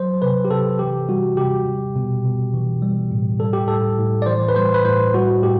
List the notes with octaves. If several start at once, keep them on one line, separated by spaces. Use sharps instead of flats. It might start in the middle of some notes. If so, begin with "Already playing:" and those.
Already playing: F#3 C5
C3 B4
G4
C3 A4
E3 G4
G3 F#4
C3 G4
G3
B2
B2
E3
G3
A2
G3 A4
G4
A2 A4
A2
D5
E3 C5
B4
G3 C5
B4
A2 C5
G3 F#4
A2 G4